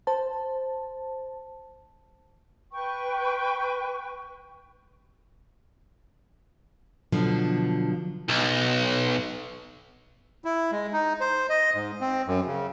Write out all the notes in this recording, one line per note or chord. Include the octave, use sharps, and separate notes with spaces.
C5 A5
B4 G5 C#6
B2 D3 F3 F#3
B1
E4
G#3
D#4
C5
D#5
G#2
C4
F#2
C#3